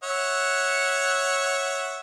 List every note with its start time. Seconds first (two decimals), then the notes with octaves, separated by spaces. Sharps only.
0.03 C#5 E5 F#5